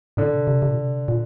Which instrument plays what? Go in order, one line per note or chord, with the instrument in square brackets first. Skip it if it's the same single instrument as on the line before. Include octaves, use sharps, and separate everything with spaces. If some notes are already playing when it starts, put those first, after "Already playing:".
[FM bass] A2 [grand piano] D3
[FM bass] C3
C3
C3
A#2
C3
A#2